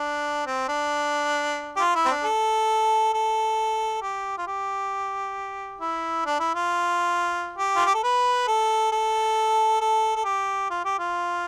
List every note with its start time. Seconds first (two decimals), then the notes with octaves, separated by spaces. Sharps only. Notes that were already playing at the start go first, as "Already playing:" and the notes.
Already playing: D4
0.46 C4
0.69 D4
1.77 G4
1.80 F4
1.95 E4
2.06 C4
2.11 D4
2.24 A4
3.13 A4
4.02 G4
4.38 F4
4.47 G4
5.81 E4
6.26 D4
6.40 E4
6.55 F4
7.58 G4
7.76 F4
7.86 G4
7.94 A4
8.03 B4
8.48 A4
8.92 A4
9.81 A4
10.16 A4
10.25 G4
10.70 F4
10.85 G4
10.99 F4